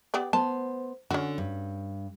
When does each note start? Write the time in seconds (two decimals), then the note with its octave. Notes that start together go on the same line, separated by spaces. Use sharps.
0.14 B3 G4 D5
0.33 B3 C5 A5
1.11 D3 C#4 F#4
1.38 G2